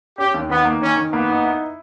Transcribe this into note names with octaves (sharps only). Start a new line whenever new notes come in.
C#4 G4
D#2
D#3 B3
A#3
D#3 C#4
D#3
A#3 B3
D#4
E4